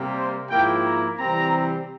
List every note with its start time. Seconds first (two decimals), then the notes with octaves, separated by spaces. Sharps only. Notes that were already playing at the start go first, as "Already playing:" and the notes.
Already playing: C3 G3 A#3
0.16 C5
0.49 G#2 F3 A#3 E4 G5
0.85 A#5
1.18 C3 E3 G3 C4 A#5